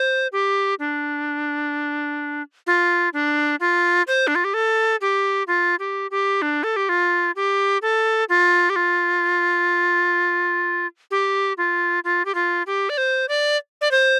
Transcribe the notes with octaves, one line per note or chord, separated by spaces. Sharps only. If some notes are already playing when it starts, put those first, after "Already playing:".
Already playing: C5
G4
D4
F4
D4
F4
C5
D4
F4
G4
A4
G4
F4
G4
G4
D4
A4
G4
F4
G4
A4
F4
G4
F4
G4
F4
F4
G4
F4
G4
D5
C5
D5
D5
C5